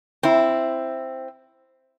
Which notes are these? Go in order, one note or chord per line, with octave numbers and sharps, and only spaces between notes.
C4 E4